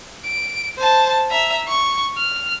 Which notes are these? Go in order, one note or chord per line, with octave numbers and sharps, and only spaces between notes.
D7
C5 A5
E5 A#5
C#6
F6